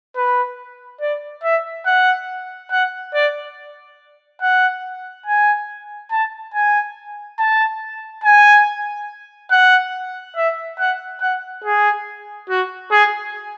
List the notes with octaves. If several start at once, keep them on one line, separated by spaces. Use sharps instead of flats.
B4
D5
E5
F#5
F#5
D5
F#5
G#5
A5
G#5
A5
G#5
F#5
E5
F#5
F#5
G#4
F#4
G#4